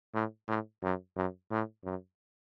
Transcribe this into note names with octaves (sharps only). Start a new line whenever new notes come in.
A2
A2
F#2
F#2
A2
F#2